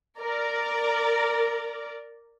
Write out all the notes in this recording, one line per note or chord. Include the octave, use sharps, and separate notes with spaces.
A#4 D5